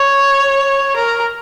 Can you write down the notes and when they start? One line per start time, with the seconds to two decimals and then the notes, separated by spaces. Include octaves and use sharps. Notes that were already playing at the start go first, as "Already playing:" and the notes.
Already playing: C#5
0.96 A#4